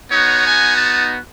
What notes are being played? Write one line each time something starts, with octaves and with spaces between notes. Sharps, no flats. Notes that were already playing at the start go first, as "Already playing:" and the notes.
B3 D#4 F#4 C#5
G#5
A5